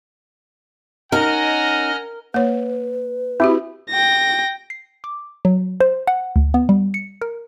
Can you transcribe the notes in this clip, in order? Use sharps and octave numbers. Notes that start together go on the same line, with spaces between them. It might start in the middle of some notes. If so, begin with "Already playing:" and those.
C#4 D#4 A#4 D#5 F#5 G#5 A#5 F6
A#3 B4 C#5
C4 E4 F#4 G4
G5 A#6
C7
D6
F#3
C5
F#5
D2
B3
G3
C#7
A#4